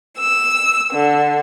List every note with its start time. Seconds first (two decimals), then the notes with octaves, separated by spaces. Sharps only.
0.19 E6
0.93 D3